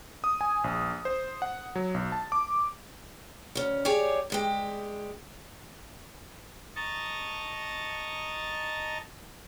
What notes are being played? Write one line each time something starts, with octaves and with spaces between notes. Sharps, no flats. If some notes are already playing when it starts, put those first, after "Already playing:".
D#6
G#5
A#1
C5
F#5
F#3
B1
A5
D6
D2 C#4
G4 G#4 C#5 D5
G2 G#3 G4
D#5 A5 A#5 C#6 A6